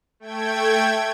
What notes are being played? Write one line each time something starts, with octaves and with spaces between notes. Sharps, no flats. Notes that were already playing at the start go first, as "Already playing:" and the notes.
A3 G5 G#6